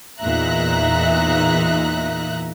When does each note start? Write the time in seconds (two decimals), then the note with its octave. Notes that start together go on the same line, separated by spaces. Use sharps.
0.22 E2 A#2 D#4 E5 A#5 F#6